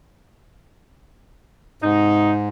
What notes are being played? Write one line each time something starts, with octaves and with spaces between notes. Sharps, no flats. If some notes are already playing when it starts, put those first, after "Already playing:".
G#2 C3 D#4